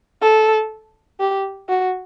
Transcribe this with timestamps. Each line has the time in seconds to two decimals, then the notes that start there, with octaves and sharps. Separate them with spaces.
0.22 A4
1.20 G4
1.69 F#4